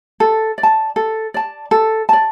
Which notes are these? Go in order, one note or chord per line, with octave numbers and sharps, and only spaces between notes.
A4
D5
A5
A4
D5 A5
A4
D5 A5